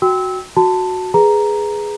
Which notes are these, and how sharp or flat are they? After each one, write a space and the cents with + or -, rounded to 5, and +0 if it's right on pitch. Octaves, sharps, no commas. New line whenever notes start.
F#4 +0 G5 +0 E6 -25
F#4 -5 A5 +10
G#4 +0 B4 +0 A#5 +0